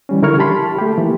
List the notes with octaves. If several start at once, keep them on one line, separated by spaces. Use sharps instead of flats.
E3 G3 C#4
D3 E4 A#4 C#6 F6 G#6
G4 A5 B5 C6
A3 G4
E3 A#3